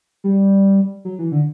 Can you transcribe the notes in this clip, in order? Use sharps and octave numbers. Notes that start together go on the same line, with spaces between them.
G3
F#3
E3
D3